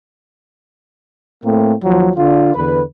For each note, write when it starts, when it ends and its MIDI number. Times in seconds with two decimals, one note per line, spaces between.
1.44 1.73 45
1.44 1.73 57
1.44 1.73 58
1.44 1.73 60
1.83 2.10 39
1.83 2.10 53
1.83 2.10 54
2.16 2.52 50
2.16 2.52 62
2.16 2.52 65
2.55 2.83 40
2.55 2.83 50
2.55 2.83 71